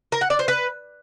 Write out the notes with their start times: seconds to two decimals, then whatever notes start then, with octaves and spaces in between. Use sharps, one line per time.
0.12 A#4
0.21 F#5
0.30 D5
0.39 C5
0.48 B4